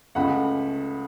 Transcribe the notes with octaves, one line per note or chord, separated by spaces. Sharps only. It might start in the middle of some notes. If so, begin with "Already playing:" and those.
C#2 C#3 A3 F#5 B5